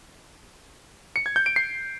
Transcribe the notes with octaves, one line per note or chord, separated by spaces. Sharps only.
C#7
G#6
G6
D7
C7